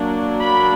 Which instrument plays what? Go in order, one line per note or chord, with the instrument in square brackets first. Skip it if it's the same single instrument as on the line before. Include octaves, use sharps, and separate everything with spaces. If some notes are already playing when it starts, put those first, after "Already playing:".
Already playing: [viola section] F#3 A#3 D4
B5